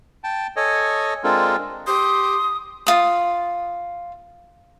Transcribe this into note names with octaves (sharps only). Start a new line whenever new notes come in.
G5 A5
A4 C#5 D#5 G#5
G#3 C4 D4 F4 A4 A#4
G4 C6 D#6
F4 D#6